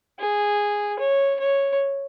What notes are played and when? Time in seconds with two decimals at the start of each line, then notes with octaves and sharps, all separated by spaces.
0.19 G#4
0.99 C#5
1.40 C#5